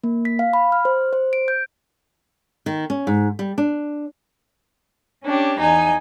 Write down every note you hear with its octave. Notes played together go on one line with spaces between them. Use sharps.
A#3
B6
F5
B5
F6
C5
C5
D7
G6
D#3
C#4
G#2
G3
D4
C#4 D4 G4
E2 D#4 G#5